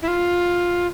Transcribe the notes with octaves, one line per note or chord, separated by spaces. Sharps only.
E4
F4